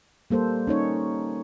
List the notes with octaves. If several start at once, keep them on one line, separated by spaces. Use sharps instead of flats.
G3 A#3 A4 C5
C#4 D#4 C#5